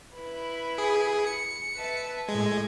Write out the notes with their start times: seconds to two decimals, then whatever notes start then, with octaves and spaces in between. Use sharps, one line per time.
0.16 E4 B4
0.78 G#4
1.27 C#7
1.75 B4 E5 A5
2.28 A2 G#3 G#6